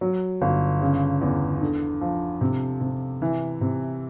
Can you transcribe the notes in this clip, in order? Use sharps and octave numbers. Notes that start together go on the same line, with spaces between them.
F#3
G1
C#3
E2
D3
F3
C3
C3
E3
C3